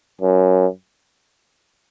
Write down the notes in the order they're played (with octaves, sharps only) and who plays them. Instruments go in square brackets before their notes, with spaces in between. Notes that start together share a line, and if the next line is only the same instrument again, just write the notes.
[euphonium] F#2